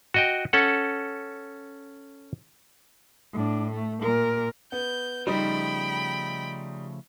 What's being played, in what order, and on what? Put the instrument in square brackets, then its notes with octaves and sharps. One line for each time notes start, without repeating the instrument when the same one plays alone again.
[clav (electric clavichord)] F#4 D#5 G5
C#4 A4 F#5
[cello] A2 D4
A3
A#2 A#4
[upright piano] B3 [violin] G6
[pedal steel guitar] C#3 F3 A3 [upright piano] G3 D#4 [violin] G5 B5